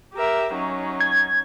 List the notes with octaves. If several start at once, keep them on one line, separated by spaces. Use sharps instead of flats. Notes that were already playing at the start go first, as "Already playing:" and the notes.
G4 A#4 E5
F#3 C#4 D#4
G#6